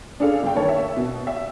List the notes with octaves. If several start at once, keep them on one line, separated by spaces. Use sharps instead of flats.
D4 G#4 A4 F5
G1 G5
D#3 A#3 C#5 A5
E5
B2
E5